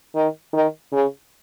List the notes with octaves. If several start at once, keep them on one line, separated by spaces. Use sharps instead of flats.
D#3
D#3
C#3